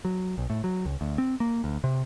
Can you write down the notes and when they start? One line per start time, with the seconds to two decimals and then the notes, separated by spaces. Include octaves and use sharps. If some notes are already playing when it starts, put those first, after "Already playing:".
0.05 F#3
0.38 B1
0.50 A2
0.64 F#3
0.85 C#2
1.01 D2
1.18 C4
1.40 A#3
1.64 D2
1.84 C3